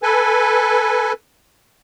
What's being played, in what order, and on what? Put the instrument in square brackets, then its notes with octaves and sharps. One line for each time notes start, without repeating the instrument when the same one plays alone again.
[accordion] A4 B4 G#5